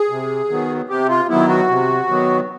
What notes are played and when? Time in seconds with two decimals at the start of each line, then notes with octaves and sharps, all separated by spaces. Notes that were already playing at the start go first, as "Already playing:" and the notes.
Already playing: G#4
0.10 C3
0.50 D#3 F#3 B3
0.89 C3 G4
1.09 F4
1.29 D#3 F#3 B3 E4
1.49 F#4
1.69 C3
2.09 D#3 F#3 B3